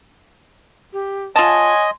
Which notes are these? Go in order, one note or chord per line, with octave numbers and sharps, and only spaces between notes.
G4
F4 C#5 D#5 F#5 G#5 A5 C6